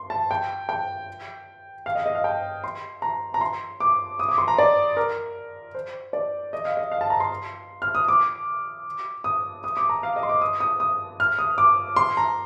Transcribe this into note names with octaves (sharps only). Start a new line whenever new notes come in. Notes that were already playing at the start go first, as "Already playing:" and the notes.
Already playing: C6
A5
G5
G5
F5
D#5
D#5
F5
G5
C6
A#5
A#5
C6
D6
D#6
D6
C6
A#5
D5
A#4
C5
D5
D#5
F5
D#5
F5
A5
A#5
C6
F6
D#6
D6
D#6
D#6
D6
A#5
F5
D#5
C6
D6
D#6
D#6
D#6
F6
D#6
D6
C6
A#5